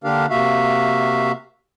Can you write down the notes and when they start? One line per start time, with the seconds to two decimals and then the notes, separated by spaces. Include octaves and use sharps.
0.04 D3 A#3 D4 G4 A#4 F5
0.30 C3 A#3 F#4 E5 F5